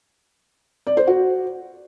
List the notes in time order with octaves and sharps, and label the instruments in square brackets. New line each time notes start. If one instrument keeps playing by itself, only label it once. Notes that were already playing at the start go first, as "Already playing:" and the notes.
[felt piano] D5
C5
F#4